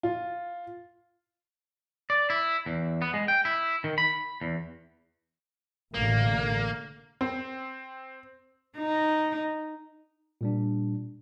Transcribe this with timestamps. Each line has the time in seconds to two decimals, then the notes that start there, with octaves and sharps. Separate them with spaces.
0.03 F4
2.10 D5
2.30 E4
2.66 E2
3.02 B3
3.14 G#3
3.28 G5
3.45 E4
3.84 D#3
3.98 B5
4.41 E2
5.94 A1 B2 D3 A#3
7.21 C4
8.78 D#4
10.41 A#2 G3 D4